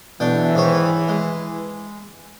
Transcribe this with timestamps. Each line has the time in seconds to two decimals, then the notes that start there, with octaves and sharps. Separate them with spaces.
0.20 B1 E3 D4 G5
0.55 G#2 D#3 C#5
1.09 G#3